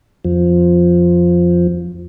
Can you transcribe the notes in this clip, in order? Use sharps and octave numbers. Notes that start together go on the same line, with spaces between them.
F2 F3